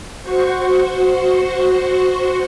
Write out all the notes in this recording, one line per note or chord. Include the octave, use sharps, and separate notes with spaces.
F#4 C5 C#6